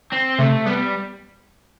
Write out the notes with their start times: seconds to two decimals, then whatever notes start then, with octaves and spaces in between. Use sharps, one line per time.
0.12 C4
0.38 C3 A3
0.65 G3 B3